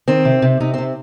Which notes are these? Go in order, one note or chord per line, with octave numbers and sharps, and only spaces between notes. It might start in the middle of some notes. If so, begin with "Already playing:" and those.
D#3 C4
C3
C3
C3 D#4
C4
C3